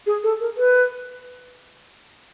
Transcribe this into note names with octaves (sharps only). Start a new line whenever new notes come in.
G#4
A4
A#4
B4